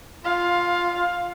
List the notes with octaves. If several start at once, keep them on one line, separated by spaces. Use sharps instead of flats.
F4 F5